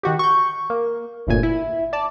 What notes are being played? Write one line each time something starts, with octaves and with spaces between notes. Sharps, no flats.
D#3 F#4 G4
C#6 G6
A#3
G1 D2 A#2 G#5
E4
D5 A5